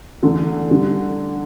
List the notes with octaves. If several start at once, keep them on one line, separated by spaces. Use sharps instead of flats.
E2 D3 A3
D3 G3